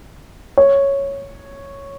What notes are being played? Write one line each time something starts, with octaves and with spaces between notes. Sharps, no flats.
C#5